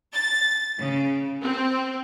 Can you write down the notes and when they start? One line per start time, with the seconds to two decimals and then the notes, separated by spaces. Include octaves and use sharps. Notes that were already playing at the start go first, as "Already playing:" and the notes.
0.14 A6
0.78 C#3
1.42 C4